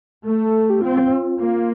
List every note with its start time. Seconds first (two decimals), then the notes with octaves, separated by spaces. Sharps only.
0.24 A3 A4
0.70 G4
0.81 C4 F4
1.39 A#3 F4